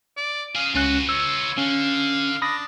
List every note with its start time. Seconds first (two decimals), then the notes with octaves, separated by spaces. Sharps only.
0.17 D5
0.55 C#3 G#4 F5
0.75 C#2 C#4 F4 F#4 B4 F#6
1.09 C#5 E6
1.58 D3 C#4 F5
2.42 D4 B5 D#6 A#6